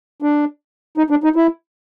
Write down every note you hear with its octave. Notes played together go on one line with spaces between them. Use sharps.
D4
D#4
D4
D#4
E4